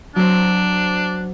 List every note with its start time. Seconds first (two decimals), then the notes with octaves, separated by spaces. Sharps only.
0.16 F#3 C4 D4 C5